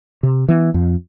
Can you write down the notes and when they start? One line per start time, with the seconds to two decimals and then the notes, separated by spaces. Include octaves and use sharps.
0.23 C3
0.48 E3 B3
0.74 F2